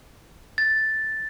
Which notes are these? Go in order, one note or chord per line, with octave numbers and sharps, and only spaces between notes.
A6